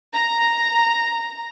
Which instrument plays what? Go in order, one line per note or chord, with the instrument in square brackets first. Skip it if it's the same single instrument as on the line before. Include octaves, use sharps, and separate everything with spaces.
[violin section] A#5